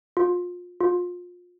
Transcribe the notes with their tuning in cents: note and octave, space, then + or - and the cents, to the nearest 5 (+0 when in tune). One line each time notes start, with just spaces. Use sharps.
F4 +30
F4 +30